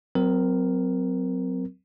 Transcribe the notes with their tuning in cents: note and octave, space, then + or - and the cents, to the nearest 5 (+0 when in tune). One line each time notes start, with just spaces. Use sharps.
F#3 +10 C4 -25 A#4 +0